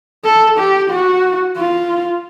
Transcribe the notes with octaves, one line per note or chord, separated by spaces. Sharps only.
A4
G4
F#4
F4